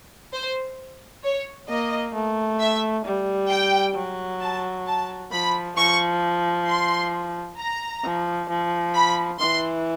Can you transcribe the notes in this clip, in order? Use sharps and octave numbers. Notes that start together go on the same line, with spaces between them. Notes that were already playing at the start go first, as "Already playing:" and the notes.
C5
C#5
A#3 D#5
A3
E5
G3
G5
F#3
A5
A5
F3 B5
F3 C#6
C6
A#5
F3
F3
B5
E3 C6